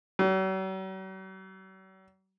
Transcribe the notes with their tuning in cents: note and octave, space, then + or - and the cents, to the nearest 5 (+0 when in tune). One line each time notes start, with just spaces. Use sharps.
F#3 +45